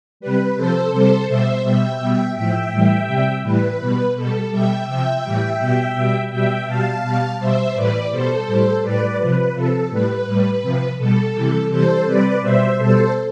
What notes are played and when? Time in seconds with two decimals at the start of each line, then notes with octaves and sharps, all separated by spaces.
0.20 C3 G3 B4
0.56 C3 F3 A4 C5
0.92 C3 G3 A4 C5
1.28 B2 G3 C5 E5
1.64 B2 G3 E5 G5
2.00 B2 G3
2.35 A2 F3 E5 G5
2.72 A2 E3 G3
3.07 C3 G3
3.43 A2 E3 G3 B4
3.80 B2 G3
4.16 B2 G3 A4
4.51 B2 G3 E5 G5
4.87 C3 F3 E5 G5
5.24 A2 E3 G3
5.59 B2 G3
5.95 B2 G3
6.31 B2 G3 E5 G5
6.67 B2 G3 F5 A5
7.03 B2 G3
7.39 B2 G3 C5 E5
7.74 A2 E3 G3 B4 D5
8.11 B2 G3 A4 C5
8.47 A2 G3
8.82 A2 G3 B4 D5
9.19 C3 F3 B4
9.55 C3 F3 A4
9.90 A2 G3 B4
10.26 A2 G3
10.62 C3 F3
10.98 B2 G3 A4
11.34 C3 E3 G3
11.70 C3 E3 G3 A4 C5
12.06 C3 G3 B4 D5
12.42 B2 G3 C5 E5
12.78 B2 G3 A4 C5